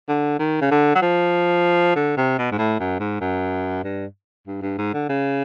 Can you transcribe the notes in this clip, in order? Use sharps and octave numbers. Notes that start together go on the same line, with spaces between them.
D3
D#3
C#3
D3
F#3
F3
D3
C3
B2
G#2
A2
F#2
G#2
F#2
G2
G2
G2
G#2
D3
C#3